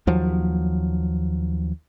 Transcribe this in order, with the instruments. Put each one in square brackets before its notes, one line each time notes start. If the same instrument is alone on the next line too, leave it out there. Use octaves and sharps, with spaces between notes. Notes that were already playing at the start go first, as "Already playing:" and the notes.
[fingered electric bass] D#2 F3 F#3